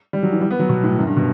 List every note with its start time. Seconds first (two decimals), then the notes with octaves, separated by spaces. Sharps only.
0.13 G3
0.23 F#3
0.32 E3
0.41 G3
0.51 B3
0.60 F#3
0.69 B2
0.83 A2
0.99 F#2
1.07 G2
1.16 B2